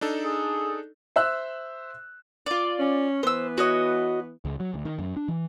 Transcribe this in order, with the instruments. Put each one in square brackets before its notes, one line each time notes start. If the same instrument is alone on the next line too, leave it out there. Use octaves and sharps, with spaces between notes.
[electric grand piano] D4 D#4 A4
[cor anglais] G#4
[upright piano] C5 E5 E6 F#6
[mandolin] F4 D5
[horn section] C#4
[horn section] E3 B3 [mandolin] C5 E6
[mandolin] F#4 C#5 D#5
[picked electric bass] C#2
F#3
D2
D#3
F#2
D4
E3